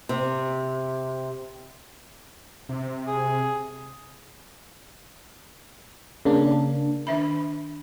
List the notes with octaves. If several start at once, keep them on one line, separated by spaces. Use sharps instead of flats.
C3
C3
G#4
C#3 A#3 D4
D#3 D4 E5 B5